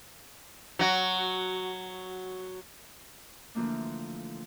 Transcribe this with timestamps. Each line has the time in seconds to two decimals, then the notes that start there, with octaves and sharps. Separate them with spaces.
0.79 F#3 F#4
3.55 D3 E3 F3 A3 A#3 D4